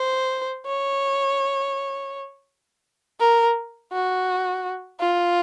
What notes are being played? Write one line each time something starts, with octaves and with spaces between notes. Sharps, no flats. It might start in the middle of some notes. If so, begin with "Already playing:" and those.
Already playing: C5
C#5
A#4
F#4
F4